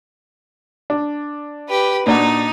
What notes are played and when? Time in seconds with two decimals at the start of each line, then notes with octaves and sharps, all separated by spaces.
0.90 D4
1.69 G4 B4
2.07 A#2 D4 D#4 F#4